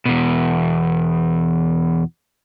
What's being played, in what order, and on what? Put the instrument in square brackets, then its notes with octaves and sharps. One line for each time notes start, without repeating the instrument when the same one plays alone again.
[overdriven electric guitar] E2 B2